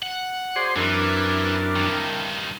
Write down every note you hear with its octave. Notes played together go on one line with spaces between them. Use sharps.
F#5
F#4 G#4 C5 D5 C6 D6
F#2 E3 C4 D4 E4 A#4
G2 D#3